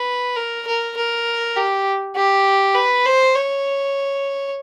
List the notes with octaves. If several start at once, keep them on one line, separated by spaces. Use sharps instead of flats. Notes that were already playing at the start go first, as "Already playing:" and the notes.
Already playing: B4
A#4
A#4
A#4
G4
G4
B4
C5
C#5